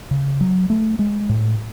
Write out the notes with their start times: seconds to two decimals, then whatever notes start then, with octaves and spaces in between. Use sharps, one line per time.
0.11 C#3
0.41 F#3
0.70 A3
0.99 G#3
1.29 A2